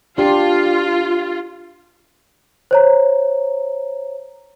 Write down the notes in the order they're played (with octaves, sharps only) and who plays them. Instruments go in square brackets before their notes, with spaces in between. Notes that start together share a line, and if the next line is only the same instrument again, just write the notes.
[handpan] D4 G4 [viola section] F4
[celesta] C5 C#5 A#5